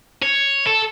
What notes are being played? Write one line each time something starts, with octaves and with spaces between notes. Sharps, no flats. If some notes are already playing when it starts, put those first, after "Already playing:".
C#5
A4